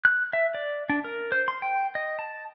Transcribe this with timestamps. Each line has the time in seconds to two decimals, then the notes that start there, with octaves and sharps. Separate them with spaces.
0.05 F#6
0.33 E5
0.55 D5
0.90 D4
1.04 A#4
1.32 C5
1.48 C6
1.62 G5
1.95 D#5
2.19 A5